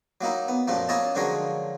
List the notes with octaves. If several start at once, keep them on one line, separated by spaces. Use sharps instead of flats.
F#3 A#3 D#4 E4
B3
F#2 A#2 F3 A3 A#3
A#3 C#4 E4 C#5 D#5 A5
D3 F3 F#3 G#3 A#4 C#5